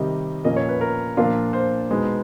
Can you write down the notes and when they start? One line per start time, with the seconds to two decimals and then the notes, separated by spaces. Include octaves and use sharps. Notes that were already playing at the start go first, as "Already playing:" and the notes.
Already playing: C3 D#3 G3 D#5
0.45 A#2 F3 A#3 C#4 D#5
0.56 C#5
0.69 B4
0.81 A#4
1.17 A#2 F3 A#3 D4 F4
1.53 C5
1.90 B2 G#3 B3 D#4